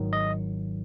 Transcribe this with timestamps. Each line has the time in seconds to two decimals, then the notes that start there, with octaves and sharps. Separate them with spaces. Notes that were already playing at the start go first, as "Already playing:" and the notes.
Already playing: G#1 G#2 D#3 F#3
0.13 D#5